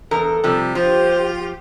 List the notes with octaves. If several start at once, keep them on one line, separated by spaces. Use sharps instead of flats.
E2 A4 A#4
C3 F3 G3
F3 F4 G4 C5